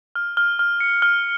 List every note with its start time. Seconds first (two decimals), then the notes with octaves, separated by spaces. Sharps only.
0.15 F6
0.37 F6
0.59 F6
0.80 C#7
1.02 F6